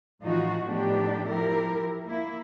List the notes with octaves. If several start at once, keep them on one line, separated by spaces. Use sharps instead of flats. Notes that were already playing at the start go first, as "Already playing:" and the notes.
A2 E3 F3 D#4 F4 F#4
A2 F3 B3 D4 D#4 G4
F3 E4 G4 A#4
A#3 E4